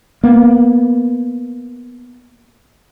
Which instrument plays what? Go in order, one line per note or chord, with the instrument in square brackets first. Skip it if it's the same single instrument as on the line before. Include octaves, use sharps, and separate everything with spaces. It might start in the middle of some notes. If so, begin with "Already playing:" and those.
[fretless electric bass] A#3 B3